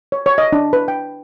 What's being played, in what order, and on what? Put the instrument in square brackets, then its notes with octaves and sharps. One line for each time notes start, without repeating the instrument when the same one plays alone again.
[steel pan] C#5
C#5
D#5
D4
B4
G5